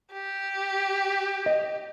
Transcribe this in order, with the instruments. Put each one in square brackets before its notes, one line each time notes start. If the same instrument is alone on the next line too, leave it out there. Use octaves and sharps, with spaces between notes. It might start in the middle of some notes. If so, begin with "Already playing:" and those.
[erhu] G4
[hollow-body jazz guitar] D#5